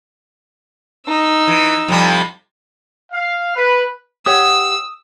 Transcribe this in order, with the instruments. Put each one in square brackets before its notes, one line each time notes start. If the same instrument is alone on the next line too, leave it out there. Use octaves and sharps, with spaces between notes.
[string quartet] D#4 E6
[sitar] E3
F2 C3 G3
[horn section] F5
B4
[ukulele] G4 C#5 F#5 [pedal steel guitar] D#6 [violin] E6